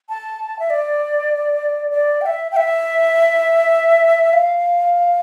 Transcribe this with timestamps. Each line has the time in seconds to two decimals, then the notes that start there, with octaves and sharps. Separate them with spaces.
0.09 A5
0.59 E5
0.70 D5
1.91 D5
2.21 G5
2.26 E5
2.52 G5
2.56 E5
4.33 F5